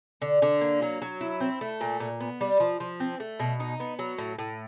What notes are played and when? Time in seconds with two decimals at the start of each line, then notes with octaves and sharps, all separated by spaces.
0.22 D3
0.42 D3
0.61 A#3
0.82 F#3
1.02 F#3
1.21 E4
1.40 C4
1.61 A3
1.81 A#2
2.00 A#2
2.20 B3
2.41 G3
2.60 F3
2.80 F3
3.00 C4
3.20 A3
3.40 B2
3.60 D#4
3.80 B3
3.99 F#3
4.18 A2
4.39 A2